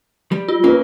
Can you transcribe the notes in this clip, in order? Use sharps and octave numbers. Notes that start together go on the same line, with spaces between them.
G3
F4
A#3 C#4 B4